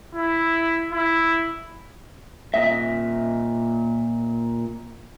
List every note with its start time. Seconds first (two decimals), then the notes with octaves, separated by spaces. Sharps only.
0.15 E4
0.93 E4
2.54 A#2 D#5 E5